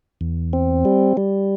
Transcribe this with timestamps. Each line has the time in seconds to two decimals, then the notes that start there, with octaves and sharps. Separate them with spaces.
0.21 E2
0.53 C4
0.85 G3
1.17 G3